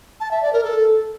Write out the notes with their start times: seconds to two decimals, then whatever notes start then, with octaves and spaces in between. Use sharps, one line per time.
0.20 A5
0.31 E5
0.42 D5
0.53 A#4
0.64 A4